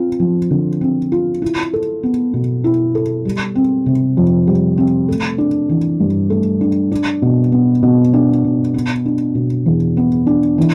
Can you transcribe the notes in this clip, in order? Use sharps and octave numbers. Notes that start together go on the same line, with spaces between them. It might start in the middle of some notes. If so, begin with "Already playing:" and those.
Already playing: C4 F4
F3
D3
C4
F4
E4
A4
B3
B2
E4
A4
G3
C4
C3
F2
G3
C4
A3
D4
E3
G2
A3
D4
D4
B2
B3
B2
D4
B2
B3
D4
B2
E2
B3
D4
E3